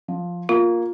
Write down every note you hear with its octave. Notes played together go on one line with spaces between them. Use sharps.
F3
A#3 F4